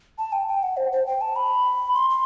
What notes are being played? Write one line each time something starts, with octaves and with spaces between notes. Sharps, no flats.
A5
G5
G5
F#5
C5
C5
G5
A5
B5
C6
C6